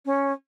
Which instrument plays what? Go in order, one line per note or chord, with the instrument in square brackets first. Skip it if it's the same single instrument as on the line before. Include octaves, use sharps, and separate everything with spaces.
[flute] C#4